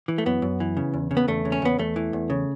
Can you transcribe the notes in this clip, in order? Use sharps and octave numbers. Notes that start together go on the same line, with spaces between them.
E3
A3
F#2 B3
F#2
E3
C#3
E2
C#3
B3
E2 A3
C#3
C#4
E2 B3
E2 A3
E3
E2
C#3